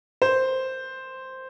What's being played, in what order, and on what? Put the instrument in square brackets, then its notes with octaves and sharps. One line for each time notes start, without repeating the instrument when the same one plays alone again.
[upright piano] C5